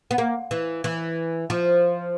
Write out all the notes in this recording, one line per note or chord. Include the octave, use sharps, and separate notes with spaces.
B3
A#3
E3
E3
F3